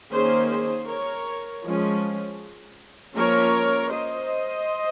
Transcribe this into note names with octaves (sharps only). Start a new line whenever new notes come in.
D#3 A#3 C#4 G#4 C5
G#4 C5
A#4 C#5
F3 G#3 C#4
F3 A#3 C#4 A#4 C#5
C5 D#5